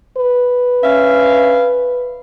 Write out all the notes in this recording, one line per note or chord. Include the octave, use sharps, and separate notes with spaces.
B4
C#4 E5 F5